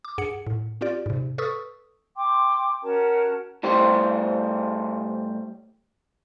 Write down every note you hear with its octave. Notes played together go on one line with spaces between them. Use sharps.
D6
G2 G#4 F#5 C#7
A2
C4 F4 G4 D5
G#2 C3
A4 B4 C#6 D#6 E6
G5 C6 D6
C#4 F#4 A#4 A5
A2 G3 G4 C5